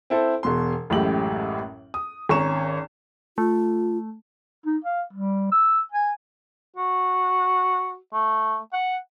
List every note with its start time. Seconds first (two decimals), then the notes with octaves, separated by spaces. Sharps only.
0.10 C4 E4 A4 C5
0.43 E1 B2 C6
0.90 A1 F#2 A2 G#3 G4 F#7
1.94 D#6
2.29 G#1 C#4 A#5 C#6 E7
3.38 A3 F4
4.66 D#4
4.84 F5
5.13 G3
5.52 E6
5.92 G#5
6.76 F#4
8.13 A3
8.73 F#5